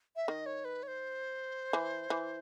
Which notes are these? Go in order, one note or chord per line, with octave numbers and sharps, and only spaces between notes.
E5
D#3 D#5
C#5
B4
C#5
C5
E3
E3